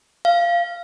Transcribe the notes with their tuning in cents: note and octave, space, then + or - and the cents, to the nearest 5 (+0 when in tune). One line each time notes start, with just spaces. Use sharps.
F5 -15